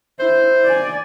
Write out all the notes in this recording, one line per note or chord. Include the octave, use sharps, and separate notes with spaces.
E4 C5
D5 G#5